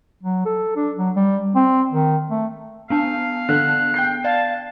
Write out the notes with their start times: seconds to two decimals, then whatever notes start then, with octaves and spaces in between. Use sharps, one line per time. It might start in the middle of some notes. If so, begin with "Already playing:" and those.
0.23 F#3
0.45 A4
0.76 D4
0.98 F#3
1.16 G3
1.55 C4
1.93 D#3
2.30 A3
2.90 B3 D4 F5 A5
3.49 D3 F#6
3.94 G5 G6 C7
4.24 D5 F5 A5